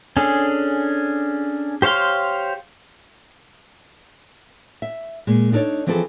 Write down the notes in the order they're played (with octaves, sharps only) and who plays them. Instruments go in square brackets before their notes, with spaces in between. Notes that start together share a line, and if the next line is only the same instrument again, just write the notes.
[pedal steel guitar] C#4 D4 G#4 A4
G4 C5 C#5 F5 C6
[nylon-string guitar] E5
A#2 G#3
D4 D#4 A4 A#4 C#5 D5
E3 F3 C4 G#4 A4